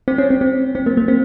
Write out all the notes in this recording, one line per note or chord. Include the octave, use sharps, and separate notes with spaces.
C4
C#4
C4
C4
C4
A#3
A#3
C4